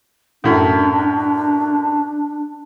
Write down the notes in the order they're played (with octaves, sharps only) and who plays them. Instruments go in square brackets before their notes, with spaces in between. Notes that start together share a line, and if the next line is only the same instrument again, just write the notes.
[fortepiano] F#2 A2 [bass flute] D4